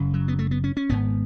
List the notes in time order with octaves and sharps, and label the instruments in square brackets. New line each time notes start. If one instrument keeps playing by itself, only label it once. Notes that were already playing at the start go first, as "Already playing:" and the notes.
Already playing: [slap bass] F#1 F#2 C#3
F#3
B3
A3
B3
C#4
C#4
G#1 G#2 B3